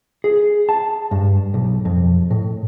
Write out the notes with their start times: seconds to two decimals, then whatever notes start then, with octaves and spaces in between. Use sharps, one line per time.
0.24 G#4
0.69 A5
1.11 G2
1.54 B1
1.85 F2
2.31 A2